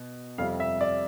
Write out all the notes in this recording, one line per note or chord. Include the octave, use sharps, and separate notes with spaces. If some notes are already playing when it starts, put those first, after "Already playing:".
Already playing: B2
F2 C3 G3 F5
E5
D5